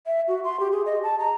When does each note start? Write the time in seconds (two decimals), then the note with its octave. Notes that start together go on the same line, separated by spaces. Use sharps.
0.06 E5
0.28 F#4
0.44 C6
0.60 G4
0.72 G#4
0.86 D#5
1.03 A5
1.19 A#5